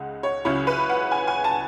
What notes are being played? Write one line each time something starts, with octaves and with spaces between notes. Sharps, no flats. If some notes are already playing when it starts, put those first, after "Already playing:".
Already playing: C#2 C#3 G#3 D#4 F#5
C#5
C#2 C#3 F#3 C#4 E4 C#5
B4
F#5
G#5
G#5
A5